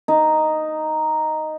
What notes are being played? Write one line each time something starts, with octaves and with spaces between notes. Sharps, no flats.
D#4